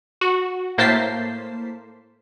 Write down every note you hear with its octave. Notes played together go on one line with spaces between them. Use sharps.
F#4
A2 A#3 C5 A5 B6 C7